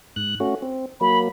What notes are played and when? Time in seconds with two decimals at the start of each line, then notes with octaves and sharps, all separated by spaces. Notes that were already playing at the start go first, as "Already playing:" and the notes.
0.16 G#2 F#6
0.40 A3 C#4 F#4
0.62 C4
1.01 F#3 A#3 B5